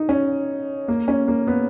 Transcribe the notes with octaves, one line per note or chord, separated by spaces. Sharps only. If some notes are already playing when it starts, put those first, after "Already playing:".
Already playing: D#4
C#4
A#3
C#4
A#3
B3